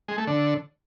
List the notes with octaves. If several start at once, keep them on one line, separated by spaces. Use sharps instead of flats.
G#3
A3
D3